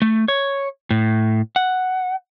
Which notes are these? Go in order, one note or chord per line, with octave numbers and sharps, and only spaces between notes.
A3
C#5
A2
F#5